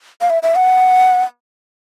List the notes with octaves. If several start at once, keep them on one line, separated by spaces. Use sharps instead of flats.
F5
E5
E5
F#5